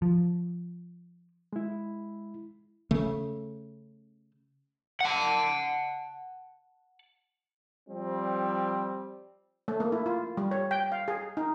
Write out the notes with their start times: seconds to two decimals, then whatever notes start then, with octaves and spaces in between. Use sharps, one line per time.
0.02 F3
1.53 G#3 E4
2.91 C#3 A3
5.00 F#5 A5
7.89 F3 G3 C4
9.68 A3
9.80 A#3
9.92 E4
10.06 F4
10.37 G3
10.51 C#5
10.71 G5
10.92 F5
11.08 G#4
11.37 D#4